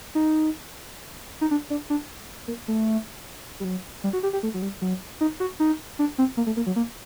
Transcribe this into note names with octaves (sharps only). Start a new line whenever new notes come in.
D#4
D#4
D4
D4
D4
A#3
A3
G3
F#3
G3
F#4
G4
G4
A3
F#3
G3
F#3
D#4
F#4
D#4
D4
C4
A#3
A3
A#3
F#3
A#3